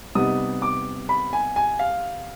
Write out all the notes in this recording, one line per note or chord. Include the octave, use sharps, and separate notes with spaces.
C3 G3 B3 D#4 D#6
D6
B5
G#5
G#5
F5